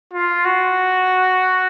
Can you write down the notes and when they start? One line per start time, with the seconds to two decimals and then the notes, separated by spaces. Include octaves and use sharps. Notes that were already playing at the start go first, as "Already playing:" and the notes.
0.13 F4
0.45 F#4